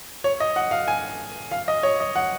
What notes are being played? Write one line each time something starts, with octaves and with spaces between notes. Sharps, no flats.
C#5
D#5
F#5
F5
G#5
F5
D#5
C#5
D#5
F#5